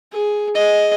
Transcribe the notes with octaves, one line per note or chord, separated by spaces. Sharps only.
G#4
G#4 D#5